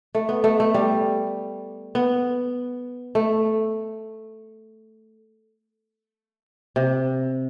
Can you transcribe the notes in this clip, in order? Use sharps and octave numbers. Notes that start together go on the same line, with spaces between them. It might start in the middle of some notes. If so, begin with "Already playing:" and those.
A3
B3
A3
A3
G3
B3
A3
C3